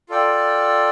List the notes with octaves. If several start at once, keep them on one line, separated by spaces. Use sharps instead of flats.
F4 A4 D5 G5